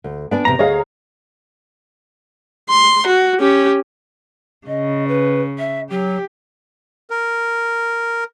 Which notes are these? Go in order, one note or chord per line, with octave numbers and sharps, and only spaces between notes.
D2
B3 D4 D5 G#5
E2 A2 C3 A#5
D2 G#4 C#5 D#5 F5
C6
F#4
C#4 G4
C#3 D#5
B4
E5
F#3 G4
A#4